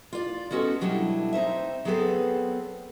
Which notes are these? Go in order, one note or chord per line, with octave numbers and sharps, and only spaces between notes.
F4 D5
G#3 B3 C#4 F#4 G4 A4
B2 F#3 G3 D4 E4 A5
C4 D#4 C5 E5
F#3 B3 C4 G#4 A4 B4